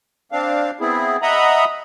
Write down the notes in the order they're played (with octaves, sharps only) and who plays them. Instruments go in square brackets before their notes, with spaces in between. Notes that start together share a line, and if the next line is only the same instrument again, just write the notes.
[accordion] C4 D4 F5
B3 C4 E4 G#4
D#5 E5 F#5 A#5 B5 D#6